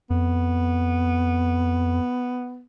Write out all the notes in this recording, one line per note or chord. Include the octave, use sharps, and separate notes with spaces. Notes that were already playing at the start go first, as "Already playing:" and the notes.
F2 B3